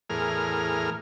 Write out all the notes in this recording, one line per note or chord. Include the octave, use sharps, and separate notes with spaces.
E2 A2 G#4 A#4 F6